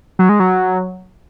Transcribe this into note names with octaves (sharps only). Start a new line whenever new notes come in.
F#3
G#3
F#3